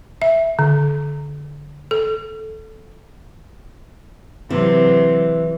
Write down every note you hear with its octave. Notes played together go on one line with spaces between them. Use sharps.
E5
D3
A4
C3 E3 F#3